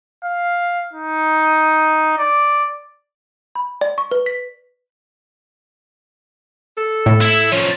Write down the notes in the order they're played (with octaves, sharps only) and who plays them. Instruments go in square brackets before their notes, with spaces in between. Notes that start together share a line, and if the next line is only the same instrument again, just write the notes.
[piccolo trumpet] F5
D#4
D5
[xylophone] B5
D5
C#6
B4
B6
[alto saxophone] A4
[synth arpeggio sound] A2
[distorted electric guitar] E4 E5
[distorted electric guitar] F3 C#4 [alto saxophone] C#5